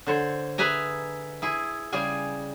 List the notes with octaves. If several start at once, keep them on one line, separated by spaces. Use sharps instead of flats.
D3 C5 C#5
G#4 B4 E5 G#5 A#5
E4 G#4
C#3 G3 G#4 G#5